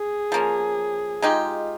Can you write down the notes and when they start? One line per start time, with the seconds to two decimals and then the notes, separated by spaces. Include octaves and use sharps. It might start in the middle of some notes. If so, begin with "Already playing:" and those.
Already playing: G#4
0.32 F3 A#3 C#4
1.22 G#3 D#4 F4 G4